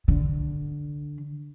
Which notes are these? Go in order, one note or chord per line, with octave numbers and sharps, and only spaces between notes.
D3